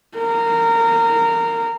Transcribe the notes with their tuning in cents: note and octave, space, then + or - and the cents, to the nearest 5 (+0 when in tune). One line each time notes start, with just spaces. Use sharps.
A#4 -20